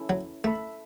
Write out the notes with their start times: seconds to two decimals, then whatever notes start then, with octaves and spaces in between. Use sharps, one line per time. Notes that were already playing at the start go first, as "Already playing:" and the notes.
Already playing: C#4 E4 A4 E5
0.09 F#3
0.44 A3 A4 E5 B5